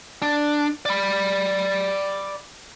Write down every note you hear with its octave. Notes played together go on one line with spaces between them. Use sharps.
D4
D5 B5